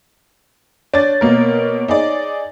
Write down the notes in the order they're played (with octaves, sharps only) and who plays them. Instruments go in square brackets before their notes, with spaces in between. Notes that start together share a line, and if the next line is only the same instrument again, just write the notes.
[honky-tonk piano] D4 A6 [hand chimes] C#5
[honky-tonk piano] B2 A#3 A#4
D#4 G#4 D5